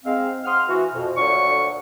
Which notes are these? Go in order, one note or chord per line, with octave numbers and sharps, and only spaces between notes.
G#2 G#3 C4 F5
F5 F#5 C6 D#6 F6
E3 F#4
F2 B2
D2 A#2 D3 F#3 C#6